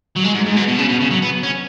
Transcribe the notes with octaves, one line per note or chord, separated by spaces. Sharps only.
F#3
G#3
G#2
G#2
B2
B2
C#3
B2
C#3
F#3
B3
C#4